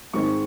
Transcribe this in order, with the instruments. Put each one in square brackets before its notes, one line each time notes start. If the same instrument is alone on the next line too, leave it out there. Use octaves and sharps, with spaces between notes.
[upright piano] G#2 D#3 G#3 C4 C#6